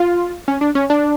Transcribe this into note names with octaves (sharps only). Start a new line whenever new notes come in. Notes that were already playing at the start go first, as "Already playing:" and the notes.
Already playing: F4
C#4
D4
C#4
D4